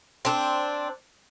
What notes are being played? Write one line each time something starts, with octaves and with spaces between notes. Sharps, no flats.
C4 D4